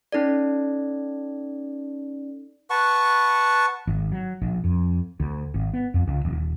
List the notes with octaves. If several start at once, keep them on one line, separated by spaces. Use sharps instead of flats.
C#4 D#4 A4 D5
B4 F#5 A5 C#6
G#1
F#3
A#1
F2
D2
G#1
B3
F2
C#2
D#1